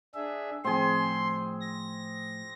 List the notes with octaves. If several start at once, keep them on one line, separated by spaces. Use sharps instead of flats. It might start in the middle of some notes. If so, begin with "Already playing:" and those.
D4 G#4 E5
A2 F3 C4 G#4 C6
A#6